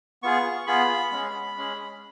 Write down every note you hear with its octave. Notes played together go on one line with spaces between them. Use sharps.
B3 F4 G#4 C#6
B3 F4 G#4 B5
G#3 C#4 G#4
G#3 C#4 G#4